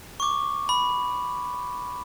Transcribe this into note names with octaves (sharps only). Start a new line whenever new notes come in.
C#6 D6
B5